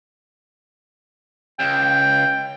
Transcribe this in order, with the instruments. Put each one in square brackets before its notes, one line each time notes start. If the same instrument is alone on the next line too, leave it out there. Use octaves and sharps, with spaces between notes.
[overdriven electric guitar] C#2 [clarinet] G5